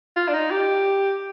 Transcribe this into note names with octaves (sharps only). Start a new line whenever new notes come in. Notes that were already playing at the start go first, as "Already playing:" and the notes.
F4
D4
D#4
G4